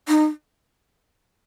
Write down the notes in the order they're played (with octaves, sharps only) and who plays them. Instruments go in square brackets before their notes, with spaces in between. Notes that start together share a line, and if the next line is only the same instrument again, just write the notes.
[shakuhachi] D#4